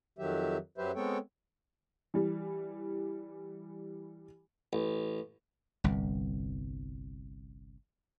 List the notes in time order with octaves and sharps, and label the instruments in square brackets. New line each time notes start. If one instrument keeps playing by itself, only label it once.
[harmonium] F2 D#3 F#3 G4 E5
F#2 F#3 G4 B4 C5 E5
G#3 B3 C4 A4 C#5 G5
[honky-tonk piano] E3 G3
[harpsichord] A1
[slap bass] G1 C2